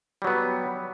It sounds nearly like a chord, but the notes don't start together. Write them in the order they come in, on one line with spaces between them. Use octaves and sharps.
G3 F#3 B3